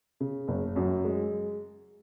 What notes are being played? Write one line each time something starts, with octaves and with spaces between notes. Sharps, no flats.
C#3
F#1
F#2
G#3